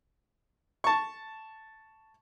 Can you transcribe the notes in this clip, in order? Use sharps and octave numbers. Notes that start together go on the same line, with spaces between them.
A5 C#6